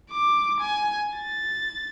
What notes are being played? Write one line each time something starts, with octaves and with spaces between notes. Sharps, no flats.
D6
G#5
A6